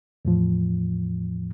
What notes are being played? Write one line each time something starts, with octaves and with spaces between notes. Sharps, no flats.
E2 A2 F3